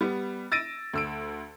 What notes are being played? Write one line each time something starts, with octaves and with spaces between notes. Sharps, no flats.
G3 B3
E6 A6 A#6 D7 D#7
D2 E6 D7